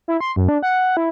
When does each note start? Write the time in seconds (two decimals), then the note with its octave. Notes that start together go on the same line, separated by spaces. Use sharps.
0.08 E4
0.21 C6
0.36 F#2
0.48 D4
0.62 F#5
0.97 E4